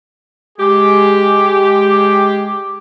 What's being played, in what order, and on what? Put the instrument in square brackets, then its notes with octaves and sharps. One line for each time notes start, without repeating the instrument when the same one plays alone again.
[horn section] G#3 G4